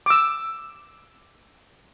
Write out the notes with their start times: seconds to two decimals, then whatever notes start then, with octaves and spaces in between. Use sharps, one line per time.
0.06 D6 E6